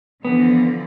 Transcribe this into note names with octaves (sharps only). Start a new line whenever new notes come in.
D3 E3 F3 B3